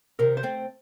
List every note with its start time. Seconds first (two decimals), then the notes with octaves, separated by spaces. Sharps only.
0.19 C3 D#3 A#4
0.37 C5
0.43 A3 C4